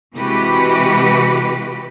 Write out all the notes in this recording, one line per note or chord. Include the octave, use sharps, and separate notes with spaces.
C3 E3 G#3 F#4 G4 B4